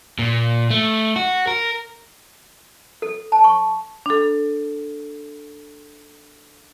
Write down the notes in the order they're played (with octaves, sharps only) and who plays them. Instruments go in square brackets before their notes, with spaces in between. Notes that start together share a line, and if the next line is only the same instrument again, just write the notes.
[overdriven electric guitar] A#2
A3
F#4
A#4
[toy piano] A4
A5
C#6
[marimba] D4 A4